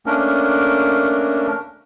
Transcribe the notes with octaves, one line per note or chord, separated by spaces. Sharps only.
A3 A#3 C#4 D4 A#4